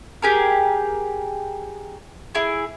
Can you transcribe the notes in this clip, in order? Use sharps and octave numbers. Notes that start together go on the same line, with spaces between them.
G4 G#4 A#4
E4 G#4